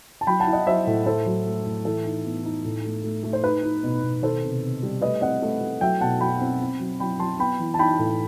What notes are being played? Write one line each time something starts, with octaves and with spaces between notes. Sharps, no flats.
A5
F#3 G5 B5
F#5 A5
E4
D#5 F#5
F#3 C5 E5
A2
A3 A4 C5
F#3
A3
A2
E3 A4
D#4
B3
D#4
A2
A3
A3
A3
C5
D#4 B4
D#4
B2
B2
D#3 A4 C5
C3
C3
G3
A3 B4 D#5
C4 D#5 F#5
A3
A3
F#3 E5 G5
B2 F#5 A5
F#3 G5 B5
C4
C4
F#3
F#3 G5 B5
F#3 A5 C6
B3 G5 B5
E3
A5
D#4 G5 B5
A2